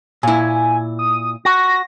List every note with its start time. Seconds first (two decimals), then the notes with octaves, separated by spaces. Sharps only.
0.23 A#2 E4 G#5
0.99 D#6
1.45 F#4 A#6